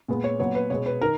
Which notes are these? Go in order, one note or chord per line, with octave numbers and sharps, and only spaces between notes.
A#2 G#3 B3
C#5
A#2 F#3 B3 C#5
B4
B2 G#3 B3 C#5
B4
D#3 A#4